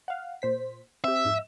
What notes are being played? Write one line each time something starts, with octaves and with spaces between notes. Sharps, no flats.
F5 F#5
A#2 C5 B6
C4 G4 E5
F2 G#2